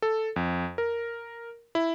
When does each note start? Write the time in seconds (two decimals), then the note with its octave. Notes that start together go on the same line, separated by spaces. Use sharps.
0.02 A4
0.36 F2
0.78 A#4
1.75 E4